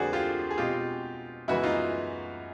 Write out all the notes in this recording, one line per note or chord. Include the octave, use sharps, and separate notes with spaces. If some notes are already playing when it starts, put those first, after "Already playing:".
Already playing: F2 D3 F3 A#3 F#4 G#4 C5 D5
F4 G4
G#4
B2 G#3 C4 F4 G4
F#2 C#3 E3 G#3 B3 E4 F#4
D#4 F4